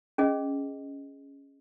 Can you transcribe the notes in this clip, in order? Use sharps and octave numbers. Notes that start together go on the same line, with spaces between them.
C#4 G#4 D#5